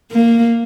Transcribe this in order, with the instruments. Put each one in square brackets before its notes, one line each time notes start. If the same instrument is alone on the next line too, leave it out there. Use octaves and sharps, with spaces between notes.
[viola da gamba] A#3